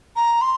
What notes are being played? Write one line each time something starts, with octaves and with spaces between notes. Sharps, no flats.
A#5
C6